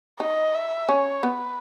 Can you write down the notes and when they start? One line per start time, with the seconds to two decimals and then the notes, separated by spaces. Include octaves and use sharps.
0.20 D#4 D#5
0.54 E5
0.89 C#4 C#5
1.23 B3 B4